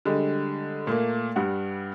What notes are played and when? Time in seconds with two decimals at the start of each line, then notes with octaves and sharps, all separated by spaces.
0.05 D3 G3 G#3
0.87 A#2 A3 A#3
1.36 G2 G3 F#5